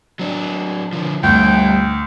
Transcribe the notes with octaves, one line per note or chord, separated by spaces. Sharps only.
F#3 D4
D3 F3
D2 G2 F4 G5